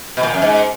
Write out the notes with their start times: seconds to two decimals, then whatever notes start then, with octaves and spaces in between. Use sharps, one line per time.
0.17 B2
0.23 A#2
0.34 F#2
0.42 G#2